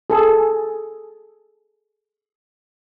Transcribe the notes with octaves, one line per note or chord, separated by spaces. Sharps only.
G#4 A4